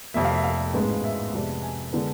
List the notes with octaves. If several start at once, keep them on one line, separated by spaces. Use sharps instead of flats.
F1 F2 C3 E5
F5
E5
F5
A1 G#2 G#3 B3
E5
F2 C3 G#3 B3 D4
G#5
D3 G#3 B3 D4